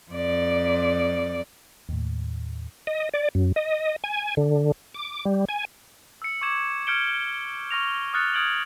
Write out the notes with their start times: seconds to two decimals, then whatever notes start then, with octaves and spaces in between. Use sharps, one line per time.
0.11 F2 D5
1.89 D#2 A2
2.87 D#5
3.14 D5
3.35 F#2
3.56 D#5
4.04 G#5
4.37 D3
4.94 D6
5.25 G3
5.49 G#5
6.22 E6 C#7
6.41 C#6 D6 G#6 E7
6.87 F6 G6 G#6 C#7 D7 G7
7.71 C#6 F6 A#6 F7
8.14 D#6 F6 F#6 A6 C#7
8.34 D#6 F6 G#6 D7 F#7